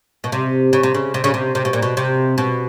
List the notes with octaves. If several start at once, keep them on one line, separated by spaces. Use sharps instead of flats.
B2
C3
C#3
C3
C#3
C3
C#3
C3
C3
B2
A#2
B2
C3
B2